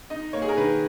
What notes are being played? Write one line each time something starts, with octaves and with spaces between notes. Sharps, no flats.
D#4 D#5
A#3 C#5
G#4
A#4
D#3 B4